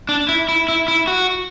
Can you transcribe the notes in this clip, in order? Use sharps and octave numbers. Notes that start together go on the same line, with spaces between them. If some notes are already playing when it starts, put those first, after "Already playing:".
D4
E4
E4
E4
E4
F#4